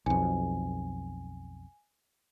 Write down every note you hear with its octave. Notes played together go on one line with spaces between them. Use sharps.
B1 F2 G#5